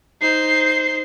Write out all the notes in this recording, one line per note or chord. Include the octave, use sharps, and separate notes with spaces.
D#4 C5 C7